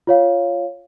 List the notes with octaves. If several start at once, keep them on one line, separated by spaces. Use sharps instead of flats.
F4 C#5 F5